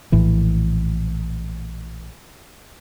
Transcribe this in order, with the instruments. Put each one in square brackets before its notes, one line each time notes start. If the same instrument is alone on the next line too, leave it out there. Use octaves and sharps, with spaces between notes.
[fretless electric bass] A#1 A2 E3